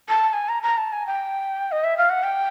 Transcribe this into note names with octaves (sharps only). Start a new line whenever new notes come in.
A5
A5
G#5
A#5
A#5
A5
G#5
G5
D#5
E5
F5
F#5
G5